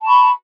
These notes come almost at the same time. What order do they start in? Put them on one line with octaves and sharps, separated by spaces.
A5 C#6 B5